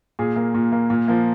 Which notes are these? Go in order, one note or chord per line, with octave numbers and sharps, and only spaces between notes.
A#2 G#4
A#3
A#2
A#3
A#2
F3 A#3